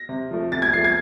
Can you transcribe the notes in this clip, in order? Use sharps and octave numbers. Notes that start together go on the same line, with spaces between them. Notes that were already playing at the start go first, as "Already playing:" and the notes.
Already playing: A#6
C3
F3 A3
C3 A6
G#6
F3 A3 C7
G#6